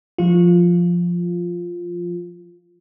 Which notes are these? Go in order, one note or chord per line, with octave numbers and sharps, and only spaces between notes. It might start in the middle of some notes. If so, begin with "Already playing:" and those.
F3 F4